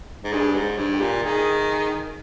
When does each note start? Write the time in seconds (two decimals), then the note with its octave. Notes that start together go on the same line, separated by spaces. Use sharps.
0.24 G#2
0.32 G2 G#4
0.55 G#2
0.77 G2
0.93 G4
1.01 A#2
1.23 D#3 G#4